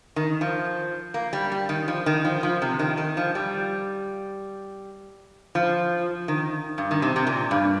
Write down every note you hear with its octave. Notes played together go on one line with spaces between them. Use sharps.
D#3
F3
A#3
G3
G3
D#3
F3
D#3
F3
F3
C3
D#3
D#3
F3
G3
F3
D#3
G2
D#3
C3
C3
A#2
G2